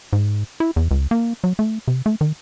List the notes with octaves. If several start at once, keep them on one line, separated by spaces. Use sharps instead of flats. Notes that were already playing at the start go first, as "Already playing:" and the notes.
G#2
E4
E2
C#2
A#3
F#3
A3
C3
A3
D#3